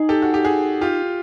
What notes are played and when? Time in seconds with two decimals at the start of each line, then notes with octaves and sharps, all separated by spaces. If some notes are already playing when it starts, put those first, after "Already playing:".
Already playing: D#4 G#4
0.09 G4 A4
0.22 F#4
0.34 G4
0.44 F#4 G#4
0.81 F4 G4